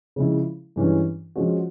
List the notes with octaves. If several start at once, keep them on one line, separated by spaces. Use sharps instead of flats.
C#3 F3 G#3 C#4 E4
G2 E3 G#3 C#4
F3 G#3 C#4 F#4